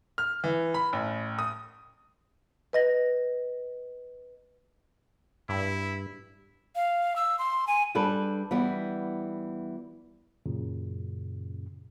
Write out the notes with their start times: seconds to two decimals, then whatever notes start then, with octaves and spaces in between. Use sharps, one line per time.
0.18 F6
0.44 E3
0.74 B5
0.93 A1
1.39 D#6
2.73 B4 D#5 A#6
5.49 G2 E4
6.76 F5
7.16 E6
7.39 C6
7.67 G#5
7.95 G3 D4 A4 B4
8.51 E3 G3 B3
10.46 F#2 A#2 C#3